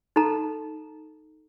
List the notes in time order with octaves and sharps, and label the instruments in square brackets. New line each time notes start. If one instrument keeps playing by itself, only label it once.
[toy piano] D#4 A4 A#5